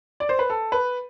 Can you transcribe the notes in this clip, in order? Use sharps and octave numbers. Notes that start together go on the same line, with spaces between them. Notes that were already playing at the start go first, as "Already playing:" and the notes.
D5
C5
B4
A4
B4